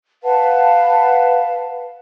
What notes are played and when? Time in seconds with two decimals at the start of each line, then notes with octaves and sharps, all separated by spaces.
0.23 B4 F5 F#5 A5